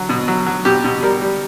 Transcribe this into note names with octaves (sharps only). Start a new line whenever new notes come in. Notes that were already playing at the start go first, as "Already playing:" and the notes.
Already playing: F#3
B2
F#3
F#3
B2 G4
B2
G3 A#4
G3